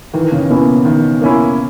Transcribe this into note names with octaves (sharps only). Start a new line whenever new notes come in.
D#3 E3
C#3
B2 A#3 C#4 E4
D#3
A#3 C#4 E4